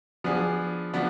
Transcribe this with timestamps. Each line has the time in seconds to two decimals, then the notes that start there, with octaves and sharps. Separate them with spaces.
0.24 F3 B3 D4 G#4
0.94 F3 B3 D4